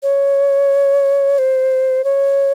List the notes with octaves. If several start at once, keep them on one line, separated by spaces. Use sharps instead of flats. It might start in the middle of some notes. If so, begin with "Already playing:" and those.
C#5
C5
C#5